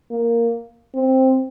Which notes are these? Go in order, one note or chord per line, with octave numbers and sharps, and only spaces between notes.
A#3
C4